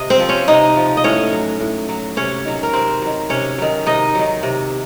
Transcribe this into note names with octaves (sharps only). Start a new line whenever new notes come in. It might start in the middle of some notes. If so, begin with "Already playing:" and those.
Already playing: C3 D#5
C4 C5
F3
C#4 C#5
C3 D#4 D#5
F3
D#5
A2 C#4 C#5
F#3
A2
F#3
C3 C#4 C#5
D#3 F#3
A#4
C3 C4 C5
D#3 F#3
C3 C#4 C#5
D#3 F#3
C3 D#4 D#5
D#3 F#3
C3